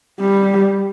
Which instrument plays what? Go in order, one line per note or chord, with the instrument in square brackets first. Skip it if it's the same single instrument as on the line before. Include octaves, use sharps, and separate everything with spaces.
[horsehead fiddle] G3